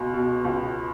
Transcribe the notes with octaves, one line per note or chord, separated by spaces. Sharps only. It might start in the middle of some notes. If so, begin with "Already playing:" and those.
Already playing: C#2 B2
B2
C#2